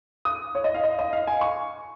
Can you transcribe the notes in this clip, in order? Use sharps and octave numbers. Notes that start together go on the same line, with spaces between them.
D#6
C#5
D#5
F5
D#5
D#5
F5
G#5
C#6